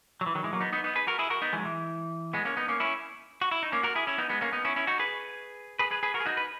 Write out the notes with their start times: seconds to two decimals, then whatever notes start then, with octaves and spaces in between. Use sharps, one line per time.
0.21 F#3
0.26 E3
0.35 D#3 F#3
0.44 E3 G#3
0.53 F#3 A#3
0.61 B3 D#4
0.73 B3 D#4
0.84 B3 D#4
0.95 G#4 B4
1.07 F#4 A#4
1.19 E4 G#4
1.30 F#4 A#4
1.42 B3 D#4
1.53 E3 G#3
1.59 F#3
1.65 E3
2.34 G#3 B3
2.45 A#3 C#4
2.57 B3 D#4
2.68 A#3 C#4
2.80 C#4 E4
3.41 F#4
3.51 E4
3.63 D#4
3.72 A#3 C#4
3.83 F#4 A#4
3.95 E4 G#4
4.07 C#4 E4
4.18 B3 D#4
4.30 G#3 B3
4.41 A#3 C#4
4.53 B3 D#4
4.65 C#4 E4
4.76 C#4 E4
4.87 D#4 F#4
4.99 G#4 B4
5.79 G#4 B4
5.91 G#4 B4
6.03 G#4 B4
6.14 F#4 A#4
6.20 G#4
6.26 D#4 F#4
6.37 B4